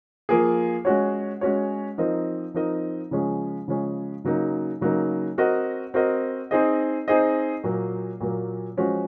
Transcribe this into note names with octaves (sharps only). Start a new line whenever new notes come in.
F3 A#3 F4 G#4
G#3 C#4 F#4 C#5
G#3 C#4 F#4 C#5
F3 C4 D#4 A#4 D#5
F3 C4 D#4 A#4 D#5
C#3 F3 G#3 C#4 G#4
C#3 F3 G#3 C#4 G#4
C#3 F#3 A#3 D#4
C#3 F#3 A#3 D#4
C4 F#4 A#4 D#5
C4 F#4 A#4 D#5
C4 D#4 G#4 C5 D#5
C4 D#4 G#4 C5 D#5
A#2 F#3 A#3
A#2 F#3 A#3
F3 G#3 C#4 F#4 C5